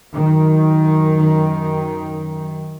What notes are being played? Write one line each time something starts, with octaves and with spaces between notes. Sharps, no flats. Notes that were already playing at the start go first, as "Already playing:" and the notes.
F#2 D#3